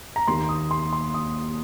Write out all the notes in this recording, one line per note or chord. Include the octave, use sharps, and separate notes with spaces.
A#5
D#2 D#3 C6
D#6
C6
C6
D#6